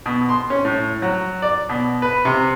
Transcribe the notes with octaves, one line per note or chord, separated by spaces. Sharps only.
B2
C6
C#4
A2
F#3
D5
B2
B4
C3